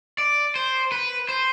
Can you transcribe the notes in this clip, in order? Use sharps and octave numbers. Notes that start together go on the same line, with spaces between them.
D5
C5
B4
C5